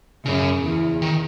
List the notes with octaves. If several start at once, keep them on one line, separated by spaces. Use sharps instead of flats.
F#2 C#3
E2
D#3